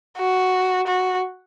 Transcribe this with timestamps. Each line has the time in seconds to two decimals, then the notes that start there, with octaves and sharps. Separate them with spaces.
0.18 F#4
0.87 F#4